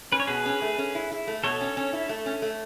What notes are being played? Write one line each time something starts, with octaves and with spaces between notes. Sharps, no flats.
C#4 B4
C#5
B2 G#4 B4
C#4
A3
C#4
E4
E4
A3
B2 A4 C#5
C#4
C#4
E4
A3
C#4
A3